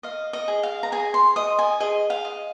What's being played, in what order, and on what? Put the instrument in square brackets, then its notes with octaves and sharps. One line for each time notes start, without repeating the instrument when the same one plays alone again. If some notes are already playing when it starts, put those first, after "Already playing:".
[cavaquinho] D#5 F5
D#5
G#4
F5
A#5
G#4 G#5
C6
D#5 D#6
G#5
G#4 D#5
F5
D#5